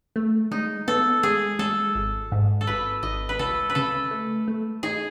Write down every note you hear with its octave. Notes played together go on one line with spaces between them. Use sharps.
A3
G#3 D#4
B3 A4
G#3 G#4
G#3 A4
G#1
G#2
A4
G#1 B4
G#1 D#5
B4
C#2 A4
B4
C#3 A4
A3
A3
D#4 G#4